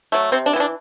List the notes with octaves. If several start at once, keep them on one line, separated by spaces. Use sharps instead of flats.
F#3 A3
C3 C4
D4
E3 B3
D4